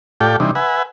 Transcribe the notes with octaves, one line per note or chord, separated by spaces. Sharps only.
A2 F4 G4 A4 D5 G5
C3 E3 G3 D4 D#4
B4 E5 F#5 G#5